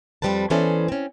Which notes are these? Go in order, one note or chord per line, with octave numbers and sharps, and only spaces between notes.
F2 G#2 G3 C4 B4 A5
E3 B3 C#4 A4 C5 D5
C4 C#4